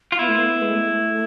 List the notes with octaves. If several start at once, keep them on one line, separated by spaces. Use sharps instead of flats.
F4
B3 E4
A3
B3
G#3
A3